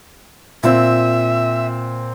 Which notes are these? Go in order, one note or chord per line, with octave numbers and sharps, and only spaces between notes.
A#2 C4 E5